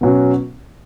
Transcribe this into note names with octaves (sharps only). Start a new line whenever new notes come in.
B2 F#3 C#4